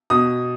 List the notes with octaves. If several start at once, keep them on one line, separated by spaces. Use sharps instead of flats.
B2 D#6